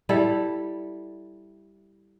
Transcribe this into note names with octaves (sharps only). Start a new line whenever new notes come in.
G3 E4 A4